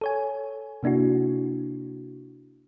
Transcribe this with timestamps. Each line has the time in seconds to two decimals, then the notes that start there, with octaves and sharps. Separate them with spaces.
0.01 A4 C#5 G#5
0.83 C3 A#3 D4 E4 F#4